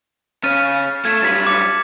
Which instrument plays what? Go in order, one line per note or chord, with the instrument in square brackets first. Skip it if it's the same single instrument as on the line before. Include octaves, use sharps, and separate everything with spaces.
[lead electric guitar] C#3 [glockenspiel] F6 A6 D#7
[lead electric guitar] A3 [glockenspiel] G#6 E7
[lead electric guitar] F#2 G3 [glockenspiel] A6 B6 F#7
[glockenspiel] D6 C#7